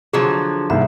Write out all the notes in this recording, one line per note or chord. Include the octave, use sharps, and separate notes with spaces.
D3 F3 F#3 G#4
C2 G#2 A#3 E5